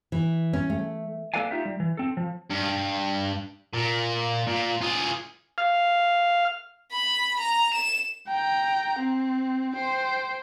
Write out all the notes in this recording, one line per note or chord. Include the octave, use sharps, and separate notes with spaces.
E3
C#4
A3
A#3 A4 B4 D5 F5 G#5
D#4 F4 G4 E5
G3
E3
C4 A4
F3
G2
A#2
A#2
F4 G#4
F5
B5
A#5
E7
G5 A#5
C4
C5 G5